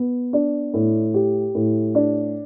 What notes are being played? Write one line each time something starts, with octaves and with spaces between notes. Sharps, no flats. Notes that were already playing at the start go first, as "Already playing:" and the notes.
Already playing: B3
D4
A2
G4
A2
D4